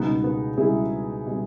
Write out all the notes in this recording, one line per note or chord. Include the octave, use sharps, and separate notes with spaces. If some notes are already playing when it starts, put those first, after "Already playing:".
Already playing: C#2 B2 G3 B3 D#4
B3
C#2 B2 G3 E4 G#4
B2 G3